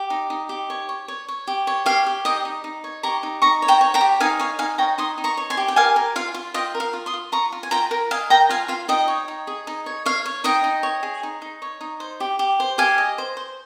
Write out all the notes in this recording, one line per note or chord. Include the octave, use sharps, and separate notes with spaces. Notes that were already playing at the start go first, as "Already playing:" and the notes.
Already playing: G4
D#4
D#4
G4
C#5
C#5
C#5
C#5
G4
C#5
G4 F5
G4
D#4 D#5 G5
D#4
D#4
C#5
G4 A#5 C#6
D#4
D#4 A#5 C#6
C#5
G5 A#5
C#5
G5 A#5
G4
D#4 F5 G#5
C#5 F5 G#5
D#4 F5 G#5
C#5 G5 A#5
D#4 C6 D#6
D#4
A#5 C#6
C#5
G#5 C6
G4
G5
A#4 F5 G#5
A#4
F4 F5
F4
F4 D#5 G5
A#4
F5
F4
C6 D#6
F4
F4 A#5 C#6
F4
G#5
F4 G5 A#5
A#4
D#5 F5 G#5
A#4 G5 A#5
F4 F5 G#5
F4 F5
D#4 D#5 G5
C#5
D#4
G#4
D#4
C#5
C#5 F5
C#5
D#4 D#5 G5
D#4
C#5
G#4
D#4
D#4
C#5
D#4
C5
G4
G4
C5
G4 F5 G#5
D#5
C5
C5